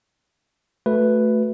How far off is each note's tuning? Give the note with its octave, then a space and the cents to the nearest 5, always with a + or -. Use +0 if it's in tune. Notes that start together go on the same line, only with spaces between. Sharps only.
A3 +0 F#4 +0 B4 +0